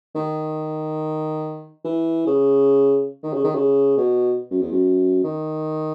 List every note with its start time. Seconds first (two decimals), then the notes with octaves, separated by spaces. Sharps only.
0.15 D#3
1.85 E3
2.27 C#3
3.23 D#3
3.33 C#3
3.44 D#3
3.55 C#3
3.97 B2
4.51 F#2
4.62 E2
4.72 F#2
5.24 D#3